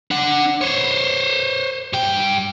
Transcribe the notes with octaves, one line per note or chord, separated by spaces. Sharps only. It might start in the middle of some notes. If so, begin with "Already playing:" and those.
D4 F#5
C5 C#5
G2 G5